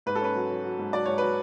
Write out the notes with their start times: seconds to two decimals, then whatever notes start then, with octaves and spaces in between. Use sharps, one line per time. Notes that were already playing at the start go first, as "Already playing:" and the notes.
0.06 G#2 B4
0.15 A4
0.21 C#4 B4
0.35 F#3
0.50 F#3
0.64 F#3
0.78 G#2
0.93 F#3 D5
1.05 G#2 C#5
1.18 F#3 B4